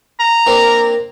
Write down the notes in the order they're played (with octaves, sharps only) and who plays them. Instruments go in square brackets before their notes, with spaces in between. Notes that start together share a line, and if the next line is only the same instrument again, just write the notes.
[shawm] A#5
[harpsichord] A#3 C4 D4